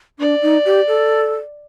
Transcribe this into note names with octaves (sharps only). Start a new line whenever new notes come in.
D4 D5
D#4
G4
A4